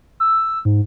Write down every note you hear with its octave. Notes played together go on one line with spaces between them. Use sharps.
E6
G#2